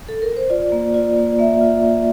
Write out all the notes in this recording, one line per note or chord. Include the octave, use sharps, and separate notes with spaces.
A4
A#4
C5
F4 D5
A#3
F4 D5
A#3
A#3 E5
F4
A#3